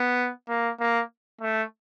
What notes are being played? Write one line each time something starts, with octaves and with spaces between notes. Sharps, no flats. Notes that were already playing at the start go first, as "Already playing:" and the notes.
Already playing: B3
A#3
A#3
A3